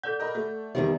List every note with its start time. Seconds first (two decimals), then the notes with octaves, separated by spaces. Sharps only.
0.03 A4 D5 F#5 G6
0.20 A#4 D#5 B5
0.35 A3
0.75 E2 D#3 G3 B3 E5